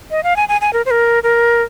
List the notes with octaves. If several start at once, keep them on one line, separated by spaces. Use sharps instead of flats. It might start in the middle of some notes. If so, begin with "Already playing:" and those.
D#5
F5
G#5
G#5
G#5
A#4
C5
A#4
A#4